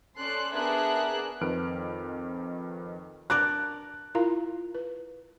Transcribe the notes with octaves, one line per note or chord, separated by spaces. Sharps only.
C#4 A4 D5 C6 F#6
B3 D4 G#4 A#4 E5 F#6
F2 D#3 B4 F6 D7
D4 A#4 D5 F#6
E4 F4 A#4 F5 A#5
B4